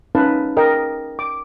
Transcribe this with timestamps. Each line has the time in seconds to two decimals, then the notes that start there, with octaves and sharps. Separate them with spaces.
0.15 C#4 D#4 B4 F5 A5
0.57 A#4 D#5 G5
1.19 D6